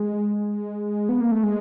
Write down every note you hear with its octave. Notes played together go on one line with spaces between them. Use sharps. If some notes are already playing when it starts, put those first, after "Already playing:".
Already playing: G#3
B3
A#3
A3
G#3